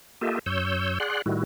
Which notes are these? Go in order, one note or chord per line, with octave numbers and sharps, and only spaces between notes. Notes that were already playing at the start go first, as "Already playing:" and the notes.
A#3 F4 G4 A4 D#5 E5
F#2 C#5 E6 G6
G#4 D5 F#5 C6 F#6
A2 D#3 G3 E4 F#4